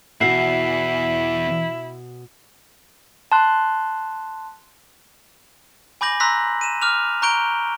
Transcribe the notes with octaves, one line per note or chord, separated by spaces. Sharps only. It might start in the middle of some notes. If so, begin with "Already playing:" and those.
E2 B2 E4 F#4 E5 F#5 C7
A5 C6 F#6
G#5 B5 D6 G6 A#6 F#7
A#5 C6 E6 F#6 A#6 B6
D#7 E7
D6 F6 F#6 F7
A#5 C#6 F#6 G6 D7 G7